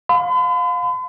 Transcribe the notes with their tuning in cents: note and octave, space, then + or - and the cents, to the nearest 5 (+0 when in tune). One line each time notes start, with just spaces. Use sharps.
F5 +25 B5 +45